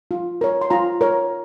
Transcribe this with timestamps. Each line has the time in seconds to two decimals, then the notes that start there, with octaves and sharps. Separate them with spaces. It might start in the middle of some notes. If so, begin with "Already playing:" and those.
0.11 F4
0.41 A#4 C#5
0.61 C6
0.70 F4 A#5
1.01 A#4 C#5